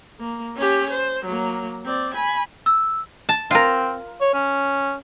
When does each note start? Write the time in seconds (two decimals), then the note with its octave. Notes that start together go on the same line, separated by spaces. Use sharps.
0.20 A#3
0.57 C#4 G4
0.91 C5
1.25 F#3 A#3
1.86 C4 D5
2.15 G#5 B5
2.66 E6
3.29 A5
3.51 C4 F4 A#4
4.21 C#5
4.34 C#4